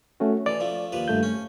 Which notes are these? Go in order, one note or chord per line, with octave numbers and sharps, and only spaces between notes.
A3 C#4 F#4
E3 D5
F3 A3
D#2 F3 B4
G2 A3 G6
C#4